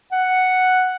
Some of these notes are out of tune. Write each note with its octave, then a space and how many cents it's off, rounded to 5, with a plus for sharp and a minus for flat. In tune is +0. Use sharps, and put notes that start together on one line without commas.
F#5 +0